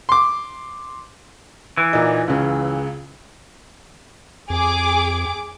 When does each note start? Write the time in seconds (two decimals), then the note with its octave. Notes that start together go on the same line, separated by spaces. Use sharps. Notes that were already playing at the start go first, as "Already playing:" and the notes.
0.09 C6 D6
1.77 E3
1.93 A#2 D#4
2.28 C#2 C#3
4.50 F2 G#4 D6